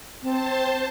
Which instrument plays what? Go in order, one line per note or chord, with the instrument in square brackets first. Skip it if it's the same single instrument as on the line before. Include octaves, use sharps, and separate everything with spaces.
[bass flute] C4 [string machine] C5 A5